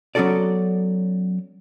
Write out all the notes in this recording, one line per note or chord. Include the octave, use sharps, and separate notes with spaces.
F#3 B3 C#4 F#4 A4 D5